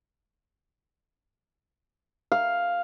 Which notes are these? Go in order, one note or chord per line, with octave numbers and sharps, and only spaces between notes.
F5